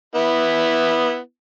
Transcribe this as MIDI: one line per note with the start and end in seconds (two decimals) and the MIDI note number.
0.16 1.18 59
0.16 1.18 64